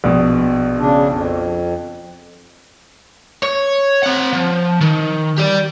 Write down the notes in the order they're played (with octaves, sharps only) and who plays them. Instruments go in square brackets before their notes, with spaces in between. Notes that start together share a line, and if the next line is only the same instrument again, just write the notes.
[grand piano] A#1 B2
[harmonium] C#3 D4
F2
[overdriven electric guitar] C#5
C4 F#5
F3
D#3
G4 D5